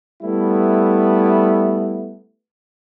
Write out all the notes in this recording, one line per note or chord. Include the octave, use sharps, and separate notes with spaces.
G3 A3 B3 E4